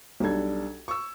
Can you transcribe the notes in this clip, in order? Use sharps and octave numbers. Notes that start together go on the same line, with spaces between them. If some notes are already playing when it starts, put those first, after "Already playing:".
B1 G3 D4 A4 G#6
C#6 E6